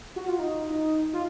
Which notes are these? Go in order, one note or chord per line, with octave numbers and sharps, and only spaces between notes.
F#4
F4
D#4
D#4
F4